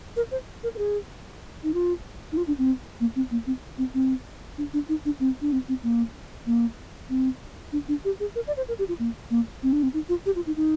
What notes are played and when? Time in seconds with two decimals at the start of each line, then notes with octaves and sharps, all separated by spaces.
0.16 A#4
0.31 C5
0.63 A#4
0.75 A#4
0.78 G#4
1.63 D#4
1.74 F4
2.32 D#4
2.37 F4
2.47 D4
2.58 C4
3.00 A#3
3.16 C4
3.31 A#3
3.47 C4
3.78 C4
3.94 C4
4.58 D4
4.73 D4
4.89 D#4
5.05 D4
5.20 C4
5.41 D4
5.52 C4
5.69 C4
5.83 A#3
6.46 A#3
7.09 C4
7.73 D4
7.88 D4
8.05 G4
8.20 G#4
8.35 A#4
8.47 D5
8.57 C5
8.68 A#4
8.79 G4
8.88 F4
8.99 A#3
9.30 A#3
9.63 C4
9.73 D4
9.83 C4
9.94 D#4
10.09 F4
10.26 G4
10.36 F4
10.47 D#4
10.57 D#4